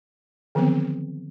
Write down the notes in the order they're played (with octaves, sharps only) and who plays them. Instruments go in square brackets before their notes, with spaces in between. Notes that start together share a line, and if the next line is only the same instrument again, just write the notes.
[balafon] D3 D#3 F3 F#3 B3 C4